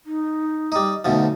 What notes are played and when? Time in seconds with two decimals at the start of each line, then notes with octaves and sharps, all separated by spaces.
0.06 D#4
0.72 G3 D#4
1.05 D2 B2 F3 D#4